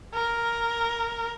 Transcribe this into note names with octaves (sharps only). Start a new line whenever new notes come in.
A#4